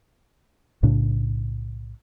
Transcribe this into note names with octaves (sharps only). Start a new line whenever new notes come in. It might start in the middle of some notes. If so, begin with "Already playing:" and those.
B1 A2 C#3 D4